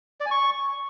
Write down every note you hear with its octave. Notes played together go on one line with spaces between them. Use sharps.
D5
G#5
C#6